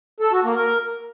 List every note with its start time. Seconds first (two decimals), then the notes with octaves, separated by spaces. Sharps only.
0.20 A4
0.32 F#4
0.44 A#3
0.56 A#4